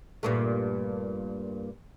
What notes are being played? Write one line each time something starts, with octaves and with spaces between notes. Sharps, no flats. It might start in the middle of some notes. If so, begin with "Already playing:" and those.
G2 A#2 A3